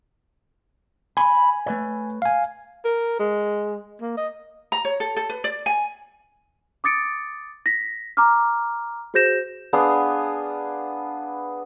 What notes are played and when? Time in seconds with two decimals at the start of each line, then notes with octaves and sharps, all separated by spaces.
1.17 G#5 B5
1.66 A3 B4 C#5
2.22 F5 G#5
2.85 A#4
3.20 G#3
4.02 A#3
4.18 D#5
4.72 A#5
4.85 C#5
5.00 A4
5.16 A4
5.29 B4
5.44 D5
5.66 G#5
6.84 D6 D#6 A6 C#7 D7
7.66 A#6 B6
8.17 A#5 D6 F6
9.14 F#4 G#4 C5 G6 A#6 E7
9.73 B3 D4 G#4 F5